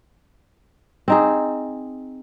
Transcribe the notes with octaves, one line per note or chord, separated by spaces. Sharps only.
C4 D#4 G#4